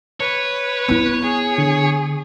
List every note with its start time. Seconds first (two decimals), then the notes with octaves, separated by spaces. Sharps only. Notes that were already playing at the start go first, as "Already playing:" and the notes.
0.20 B4 C#5
0.88 B3 E4
1.23 G#4
1.58 D3